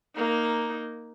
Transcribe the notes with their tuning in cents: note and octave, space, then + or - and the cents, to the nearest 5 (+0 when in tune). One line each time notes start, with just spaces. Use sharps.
A#3 +0 D#4 +0